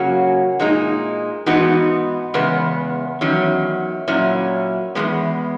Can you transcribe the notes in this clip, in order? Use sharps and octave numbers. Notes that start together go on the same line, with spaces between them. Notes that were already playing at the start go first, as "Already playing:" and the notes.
Already playing: C#3 F#3 A#3 C#4 F#4
A#2 G#3 D#4
G#2 E3 B3 D#4 F#4
E2 C#3 G#3 B3
E2 D#3 F#3 C#4
A#2 F#3 C#4 E4
E2 C#3 G#3 B3